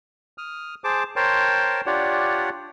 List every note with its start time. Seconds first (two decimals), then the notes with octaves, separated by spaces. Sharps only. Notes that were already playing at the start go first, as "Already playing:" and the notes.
0.38 D#6 F6
0.84 G#4 C5 A5 D6
1.16 A#4 C5 C#5 G5 A5 C6
1.86 D4 F4 G4 C#5 D5 F#5